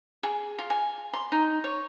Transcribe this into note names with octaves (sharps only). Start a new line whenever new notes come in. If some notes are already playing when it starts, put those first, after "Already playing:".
G#4
F4
G#5
C6
D#4
C#5